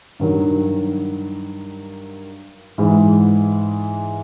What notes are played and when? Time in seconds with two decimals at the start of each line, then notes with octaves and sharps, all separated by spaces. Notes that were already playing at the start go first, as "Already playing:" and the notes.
0.20 G2 D#3 F#3
2.78 G#2 E3 G#3